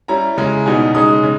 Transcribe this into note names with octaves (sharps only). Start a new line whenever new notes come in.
G3 C#4 E4 A#5
C#3 G#3 C#4 E4
B2 G3 B3 D#4 G#5
C#3 G#3 D#4 D#6
C#3